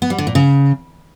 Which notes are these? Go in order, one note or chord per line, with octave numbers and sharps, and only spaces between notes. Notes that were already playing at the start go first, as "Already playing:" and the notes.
B3
G3
D3
A#2
C#3